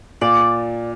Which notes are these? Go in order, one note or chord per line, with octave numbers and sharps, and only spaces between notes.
A#2 D5